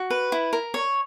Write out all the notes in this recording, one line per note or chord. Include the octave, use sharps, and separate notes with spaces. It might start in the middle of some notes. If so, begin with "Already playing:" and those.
Already playing: F#4
B4
E4
A#4
C#5